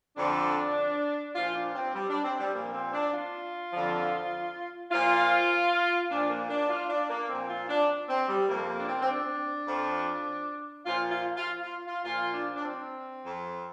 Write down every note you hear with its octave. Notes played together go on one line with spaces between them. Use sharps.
F2 D3 F3 D4
A#2 F3 F4
D4
C4
G3
D4
C4
G3
A#2 F3 A#3
C4
D4
F4
F2 D3 F3
A#2 F3 F4
A#2 F3 D4
A#3
D4
F4
D4
A#3
A#2 F3 C4
F4
D4
C4
G3
F2 C3 F3 A#3
A#3
D4
C4
C4
D4
F2 F3
A#2 F3 F4
F4
F4
F4
F4
A#2 F3 F4
D4
D4
C4
F2 F3